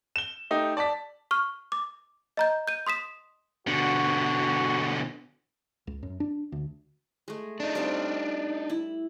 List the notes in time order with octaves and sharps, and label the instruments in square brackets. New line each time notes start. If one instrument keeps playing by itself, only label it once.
[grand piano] E7 G7
A3 D#4 G4
D5 A5 D6 B6
[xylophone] C#6 F6
D6
D#5 A#5 G6
G6 D#7
C6 D#6 B6 E7
[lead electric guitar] B2 D3 [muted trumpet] F#4
[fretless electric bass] C#2
F#2
D4
D2
[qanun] G#3 A3
[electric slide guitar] D4 D#4
[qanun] G3 C4 F5
E4